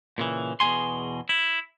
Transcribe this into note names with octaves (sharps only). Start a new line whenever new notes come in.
A#2 C#3 E3
E2 B2 D4 G#4 G#5 C6
E4